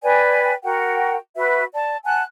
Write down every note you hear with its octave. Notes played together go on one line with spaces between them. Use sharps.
B4 D5 G5 G#5
F#4 A#4 F#5 G5
F#4 B4 E5
D5 A5
F#5 G#5 A5 F#6